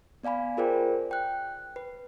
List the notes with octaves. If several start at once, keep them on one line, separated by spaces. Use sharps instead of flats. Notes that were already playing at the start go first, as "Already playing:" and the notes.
B3 D5 F5 G#5 B5
F4 G#4 A#4 C5 D5 G5
G5 F#6
B4